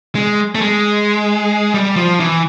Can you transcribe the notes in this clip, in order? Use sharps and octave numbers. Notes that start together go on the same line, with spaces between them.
G#3
A3
G#3
G3
F3
E3